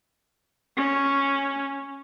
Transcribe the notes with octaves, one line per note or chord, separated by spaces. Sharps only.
C#4